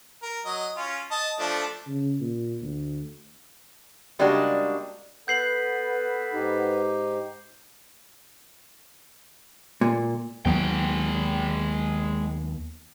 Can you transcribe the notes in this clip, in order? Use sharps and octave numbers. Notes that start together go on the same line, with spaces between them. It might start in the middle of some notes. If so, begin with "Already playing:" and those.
A#4
F#3 D#5
C#4 F4
D#5 A5
F3 A3 D4
C#3
A#2
D2
C#3 G3 G#3 A#3 D4 F#4
B3 A4 B4 G6 C7 F#7
G#2 D#4 G4
A#2
D#2 F#3 G#3 B3 G5